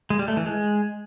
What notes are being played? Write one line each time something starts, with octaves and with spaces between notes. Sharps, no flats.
G#3
G3
A3
E3
G#3